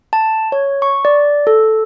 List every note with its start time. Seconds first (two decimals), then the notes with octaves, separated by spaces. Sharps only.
0.13 A5
0.52 C#5
0.82 C#6
1.05 D5
1.47 A4